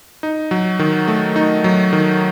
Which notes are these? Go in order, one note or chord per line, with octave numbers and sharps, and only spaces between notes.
D#4
F#3
D#3
A3
D#4
F#3
D#3